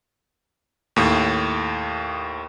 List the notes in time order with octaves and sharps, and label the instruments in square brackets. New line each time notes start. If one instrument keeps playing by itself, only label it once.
[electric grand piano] D#2 A2